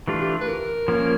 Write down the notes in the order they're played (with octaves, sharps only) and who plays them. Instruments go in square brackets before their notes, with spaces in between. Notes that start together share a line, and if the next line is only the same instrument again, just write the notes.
[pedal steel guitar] E3 A3 D4 F4 [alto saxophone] G4
[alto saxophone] G4
B4
A#4
[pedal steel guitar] F3 A#3 C#4